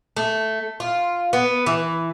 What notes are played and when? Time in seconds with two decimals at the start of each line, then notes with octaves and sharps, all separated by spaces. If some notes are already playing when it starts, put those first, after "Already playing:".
0.16 A3
0.80 F4
1.33 B3
1.66 E3